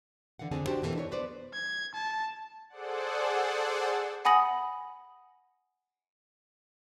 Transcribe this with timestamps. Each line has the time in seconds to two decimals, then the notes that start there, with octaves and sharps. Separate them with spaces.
0.39 D3 E3 F5 F#5
0.51 F2 D3 C4 G#4 A5
0.67 D4 F#4 G4 C5
0.82 F2 B2 E3 A#3 A4
0.95 D4 D#4 B4 C#5
1.11 B3 B4 C5 D5
1.54 G#6
1.94 A5
2.69 G#4 A4 C5 D5 F#5
4.25 F#5 G#5 B5 D#6 A#6 F#7